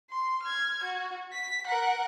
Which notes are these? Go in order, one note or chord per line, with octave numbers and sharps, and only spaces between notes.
C6
F6 G#6
F#4
B6
A#4 F#5